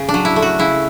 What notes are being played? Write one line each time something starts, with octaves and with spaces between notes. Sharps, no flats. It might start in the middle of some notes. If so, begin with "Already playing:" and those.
Already playing: C#3
D4
F#3
E4
A3
F#4
C#3 E4